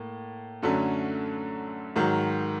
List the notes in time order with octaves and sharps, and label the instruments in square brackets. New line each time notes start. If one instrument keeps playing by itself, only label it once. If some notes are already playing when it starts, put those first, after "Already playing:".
Already playing: [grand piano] A2 A#3
F#2 D3 F#3 A3 C#4
G#2 D#3 F#3